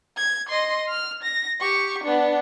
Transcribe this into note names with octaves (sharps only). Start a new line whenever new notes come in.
G#6
D#5 C6
F6
A#6
G4 C#6
B3 D4